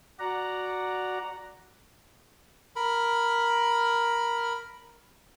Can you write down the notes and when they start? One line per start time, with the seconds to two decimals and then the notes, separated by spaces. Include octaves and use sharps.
0.20 F#4 D5 F#5 A#5
2.76 A#4 B5